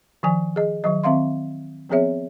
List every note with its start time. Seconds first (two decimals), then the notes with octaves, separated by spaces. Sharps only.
0.23 D#3 F3 G#5
0.56 G#4 D#5
0.84 D#3 F#3 D#5
1.04 D#3 C4 E5 F5 C6
1.89 F3 B3 C4 G#4 C#5 E5